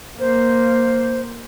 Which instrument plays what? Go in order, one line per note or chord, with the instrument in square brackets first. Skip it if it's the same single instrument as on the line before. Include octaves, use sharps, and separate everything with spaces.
[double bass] A#3 [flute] C5